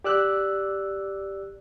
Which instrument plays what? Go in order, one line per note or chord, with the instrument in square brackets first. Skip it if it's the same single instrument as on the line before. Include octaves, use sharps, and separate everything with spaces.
[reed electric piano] G4 D5 E6 F#6